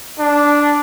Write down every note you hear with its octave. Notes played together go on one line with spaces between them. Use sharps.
D4